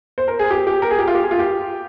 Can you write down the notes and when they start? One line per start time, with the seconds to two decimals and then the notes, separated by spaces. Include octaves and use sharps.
0.18 C5
0.28 A#4
0.39 G#4
0.51 G4
0.67 G4
0.82 A#4
0.91 G#4
0.99 G4
1.07 F4
1.15 G4
1.24 G#4
1.31 F4
1.39 G4